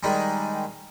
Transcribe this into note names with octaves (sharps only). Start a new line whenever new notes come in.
D#3 G3 G#3